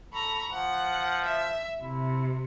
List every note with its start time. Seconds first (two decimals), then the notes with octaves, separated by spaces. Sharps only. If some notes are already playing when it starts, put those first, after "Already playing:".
0.13 A4 A#5 B5 C#6
0.52 F3 F#5
1.24 E5
1.82 C3 E4